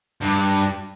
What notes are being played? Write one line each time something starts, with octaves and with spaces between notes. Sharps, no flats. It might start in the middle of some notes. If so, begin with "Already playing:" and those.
G2